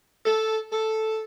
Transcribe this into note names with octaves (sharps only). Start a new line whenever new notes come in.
A4
A4